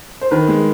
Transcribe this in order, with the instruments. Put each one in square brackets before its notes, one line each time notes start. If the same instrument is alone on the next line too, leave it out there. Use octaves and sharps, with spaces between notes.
[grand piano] C5
D#3 B4
G#3